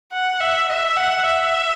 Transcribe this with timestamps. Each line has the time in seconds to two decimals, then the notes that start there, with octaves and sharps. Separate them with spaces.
0.12 F#5
0.40 E5
0.69 E5
0.96 F#5
1.25 E5